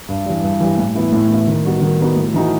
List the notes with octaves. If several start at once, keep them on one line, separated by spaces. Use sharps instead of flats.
G2
E3 G3
G2
E3 G3
A2
E3 B3 E4
A2
E3 B3 E4
D#3
G3 B3 D#4 F#4
D#3
G3 B3 D#4 F#4
A2
E3 A3 D#4 F#4